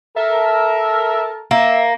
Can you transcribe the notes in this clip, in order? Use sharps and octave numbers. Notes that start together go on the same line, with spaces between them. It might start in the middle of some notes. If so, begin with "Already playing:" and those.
A4 A#4 E5
A#3 E5